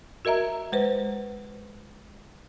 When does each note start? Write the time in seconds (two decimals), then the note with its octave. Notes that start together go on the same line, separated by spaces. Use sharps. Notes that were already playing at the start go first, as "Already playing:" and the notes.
0.25 F#4 A#4 D#5 E5 A#5
0.72 G#3 B4 C5